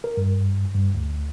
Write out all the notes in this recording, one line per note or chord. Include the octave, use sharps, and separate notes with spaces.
A#4
G2
G2
D2